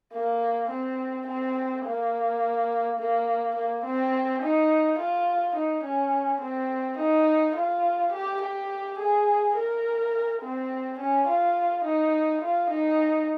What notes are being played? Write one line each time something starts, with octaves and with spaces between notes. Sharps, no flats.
A#3
C4
C4
A#3
A#3
A#3
C4
D#4
F4
D#4
C#4
C4
D#4
F4
G4
G4
G#4
A#4
C4
C#4
F4
D#4
F4
D#4